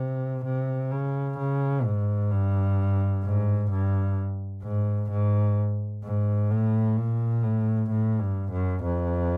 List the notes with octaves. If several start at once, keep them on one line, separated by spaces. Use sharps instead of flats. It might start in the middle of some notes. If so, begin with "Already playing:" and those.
Already playing: C3
C3
C#3
C#3
G#2
G2
G#2
G2
G#2
G#2
G#2
A2
A#2
A2
A2
G2
F#2
F2